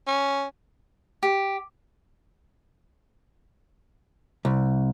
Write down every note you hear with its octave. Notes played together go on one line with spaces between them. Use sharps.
C#4
G4
C2